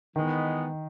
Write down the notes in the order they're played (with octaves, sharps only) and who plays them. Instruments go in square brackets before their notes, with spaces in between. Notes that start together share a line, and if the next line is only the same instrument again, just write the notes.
[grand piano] D#3 [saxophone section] E3 G#3 B3